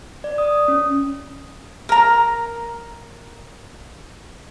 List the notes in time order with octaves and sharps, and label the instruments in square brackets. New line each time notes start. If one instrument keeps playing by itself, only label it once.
[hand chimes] D5
D#6
C#4
[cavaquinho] A#4 A#5